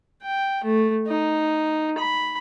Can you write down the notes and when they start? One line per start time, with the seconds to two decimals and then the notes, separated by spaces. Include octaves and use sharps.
0.22 G5
0.63 A3
1.07 D#4
1.98 B5